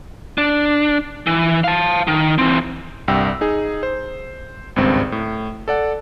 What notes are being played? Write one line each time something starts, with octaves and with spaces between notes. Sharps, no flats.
D4
E3
F5 A5
D#3
E3 C4
C2 G2 G5 E6
D#4 G#4
C5
G#1 C#2 G2 C4
A2
A4 D5 F#5